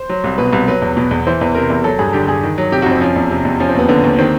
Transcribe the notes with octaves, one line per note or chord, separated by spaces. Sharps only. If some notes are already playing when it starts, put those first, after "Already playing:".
Already playing: C5
F#3
C2
B2 B4
C2
F#3 B4
E2
B2
E2
E3 C5
E2 B4
C3 A#4
E2
F#3 A4
G2 G#4
D3 G4
G2 G#4
D#3
F#3
C3 G4
F#4
F2 C4
F3 C#4
E2
C3
E2
F3 C#4
C4
D#2 B3
D3 B3
D#2
D#3 C4